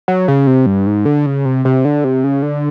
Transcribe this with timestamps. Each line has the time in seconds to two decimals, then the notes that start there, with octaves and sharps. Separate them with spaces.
0.08 F#3
0.28 C#3
0.47 C3
0.66 G2
0.87 G#2
1.05 D3
1.26 C#3
1.45 C3
1.65 C3
1.85 D3
2.04 C3
2.24 C#3
2.42 D3